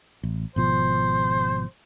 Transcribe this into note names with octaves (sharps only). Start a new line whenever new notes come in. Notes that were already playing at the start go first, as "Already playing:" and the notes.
A1
G#1 B2 F3 C5